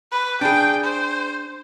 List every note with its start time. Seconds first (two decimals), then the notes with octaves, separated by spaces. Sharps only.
0.12 B4
0.41 D4 G#4 G5
0.84 C5